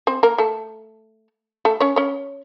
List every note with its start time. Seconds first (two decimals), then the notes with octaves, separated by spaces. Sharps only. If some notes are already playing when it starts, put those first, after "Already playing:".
0.07 C4 C5
0.23 A#3 A#4
0.38 A3 A4
1.65 A3 A4
1.80 C#4 C#5
1.96 C#4 C#5